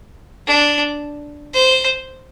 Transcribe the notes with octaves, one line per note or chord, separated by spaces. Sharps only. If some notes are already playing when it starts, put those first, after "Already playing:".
D4
C5